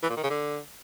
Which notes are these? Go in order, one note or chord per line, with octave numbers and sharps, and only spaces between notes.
E3
A#2
D#3
C#3
D3